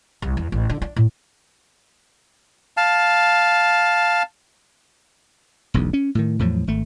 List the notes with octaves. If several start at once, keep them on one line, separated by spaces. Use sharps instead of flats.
C2
E2
A1
D3
D4
A2
F5 A5
E1 B1 E2
C#4
A2 D#3
E2 A2 F3 F#3
G#1 A3